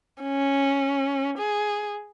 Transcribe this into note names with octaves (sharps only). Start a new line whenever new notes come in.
C#4
G#4